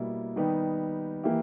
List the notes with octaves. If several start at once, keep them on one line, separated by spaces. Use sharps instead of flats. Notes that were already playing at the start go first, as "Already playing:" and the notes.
Already playing: B2 G3 A#3 E4
D#3 G3 B3 D#4 G4
E3 A#3 E4 G4